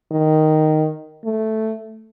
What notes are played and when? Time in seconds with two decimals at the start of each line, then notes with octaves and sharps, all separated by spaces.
0.12 D#3
1.25 A3